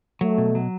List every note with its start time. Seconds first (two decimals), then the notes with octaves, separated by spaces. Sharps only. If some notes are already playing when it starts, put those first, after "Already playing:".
0.21 F#3 A3
0.38 B2
0.55 F#3